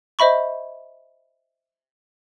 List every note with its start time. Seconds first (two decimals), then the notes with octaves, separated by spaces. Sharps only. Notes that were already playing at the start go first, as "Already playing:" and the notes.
0.19 C5 D#5 E5 B5 C#6